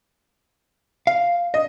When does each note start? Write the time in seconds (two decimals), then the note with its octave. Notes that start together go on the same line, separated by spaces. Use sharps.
1.07 F5
1.54 D#5